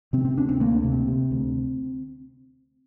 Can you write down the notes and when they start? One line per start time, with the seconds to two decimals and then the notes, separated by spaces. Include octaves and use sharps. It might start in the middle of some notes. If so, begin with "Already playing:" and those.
0.13 C3 C4
0.25 C4
0.37 D2 D4
0.49 C4
0.60 D2 A#3
0.84 C3
0.92 C4
1.08 C3
1.31 D2